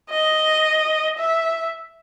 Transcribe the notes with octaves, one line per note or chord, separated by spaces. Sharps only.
D#5
E5